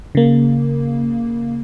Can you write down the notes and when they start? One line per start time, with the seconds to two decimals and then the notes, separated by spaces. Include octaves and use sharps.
0.15 C#3 A#3